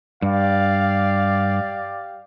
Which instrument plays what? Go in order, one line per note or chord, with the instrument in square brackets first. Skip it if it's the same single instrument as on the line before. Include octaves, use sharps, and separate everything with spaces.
[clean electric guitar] G2 [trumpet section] G4 D5 F5